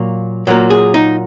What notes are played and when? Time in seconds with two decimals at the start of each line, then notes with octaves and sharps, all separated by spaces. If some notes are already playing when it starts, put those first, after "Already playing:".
Already playing: A#2 F#3 A#3
0.47 A#2 F#3 A#3
0.70 G#4
0.94 D#4